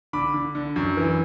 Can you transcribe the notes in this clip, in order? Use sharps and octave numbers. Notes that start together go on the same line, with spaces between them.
D3 B5 D6
D3
D3
F#2
E3